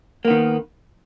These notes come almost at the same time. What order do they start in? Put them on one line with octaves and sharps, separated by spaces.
A#3 B3 D#3